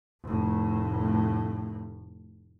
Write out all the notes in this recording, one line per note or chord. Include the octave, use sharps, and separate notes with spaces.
F1 A2